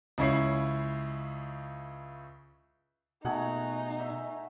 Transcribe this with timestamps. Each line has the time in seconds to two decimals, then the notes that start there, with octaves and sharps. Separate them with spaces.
0.18 C#2 C#3 E4 C#5 C7
3.25 B2 A3 D#4 G#4 F#5
4.00 E5